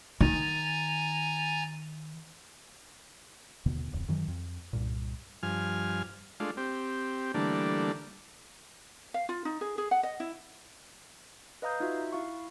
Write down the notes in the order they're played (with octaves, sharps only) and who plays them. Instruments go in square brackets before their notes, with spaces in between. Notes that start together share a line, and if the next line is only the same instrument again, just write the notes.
[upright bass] D#3 [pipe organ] G#5 A#5 A6
[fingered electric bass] D#2 B2 D3 B3
D1 F2
F#2 D#3 E3 F#3
F2
C2 G2 A#2
[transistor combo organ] G2 F3 G#5 F6
G#3 A3 D4 F4
C4 G4
D3 E3 G3 A3 A#3 D4
[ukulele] F5
F4
D#4
G#4
G#4
F#5
D#5
E4
[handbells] B4 D#5 F5 A#5 D#6 G6
D#4 F4 F#4 E5
E4 F5 C#6